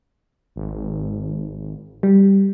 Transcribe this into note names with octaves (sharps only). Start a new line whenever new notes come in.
G#1
G3